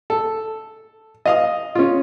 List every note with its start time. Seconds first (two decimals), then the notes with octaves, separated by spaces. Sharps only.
0.10 A4
1.26 D#5 F5 D#6
1.75 C#4 F4